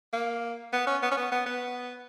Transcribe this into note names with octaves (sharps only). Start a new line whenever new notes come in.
A#3
B3
C#4
B3
C#4
B3
B3
B3